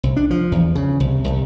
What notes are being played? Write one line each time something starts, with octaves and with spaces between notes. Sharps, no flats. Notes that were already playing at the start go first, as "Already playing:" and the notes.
C2
D4
F3
E2
C#3
C2
C2